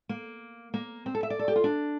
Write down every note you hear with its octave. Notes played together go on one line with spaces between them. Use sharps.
A#3
A#3
C4
A4
E5
D5
A4
G4
F4
D4